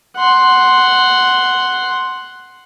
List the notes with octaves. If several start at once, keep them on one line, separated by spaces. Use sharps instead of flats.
F#5 C6